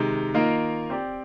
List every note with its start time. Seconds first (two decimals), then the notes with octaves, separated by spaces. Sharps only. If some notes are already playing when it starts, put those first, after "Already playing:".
Already playing: C3 D#3 G#3 D#4
0.34 D#3 A#3 F4 A#4 D#5
0.90 C4 G4 D5